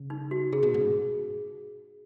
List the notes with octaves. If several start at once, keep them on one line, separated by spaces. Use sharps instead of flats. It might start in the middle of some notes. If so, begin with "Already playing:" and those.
Already playing: C#3
D#4
F#4
C#3 G#4
B2
G#2